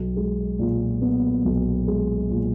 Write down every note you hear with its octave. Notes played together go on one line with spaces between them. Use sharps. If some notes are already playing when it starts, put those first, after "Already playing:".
Already playing: B1
G#3
A#2
B3
B1
G#3
A#2